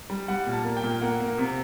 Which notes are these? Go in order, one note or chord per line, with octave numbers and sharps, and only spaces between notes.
G3
G3 F#5
A#2
A5
A#3
G5
A#2
A#3 F#5
A#3
C3